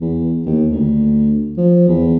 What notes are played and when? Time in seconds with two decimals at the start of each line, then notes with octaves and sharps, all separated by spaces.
0.01 E2
0.46 D#2
0.72 D2
1.57 F3
1.88 E2